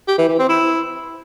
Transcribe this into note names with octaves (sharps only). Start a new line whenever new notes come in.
G4
E3
E3
C4
E4